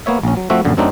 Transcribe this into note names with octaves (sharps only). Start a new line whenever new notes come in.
A#3 B3 C#5 E5
A#1 C#4
F#3
F3 A3 C4 F#4 E5
A#1 F#2 D3
F#2 F#3 A3 C4 D4 D#4